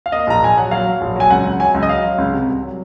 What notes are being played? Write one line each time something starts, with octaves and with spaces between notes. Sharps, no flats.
F5
A#3 D#5
A#1 A#5
A#1 G#5
F#3 F#5
F#3 F5
F#3
A#1
F#3 G#5
C#2 F#5
C#2
F#3 G#5
C#2
D#5
F#3 F5
F#3
C#2
C3
C2
F#3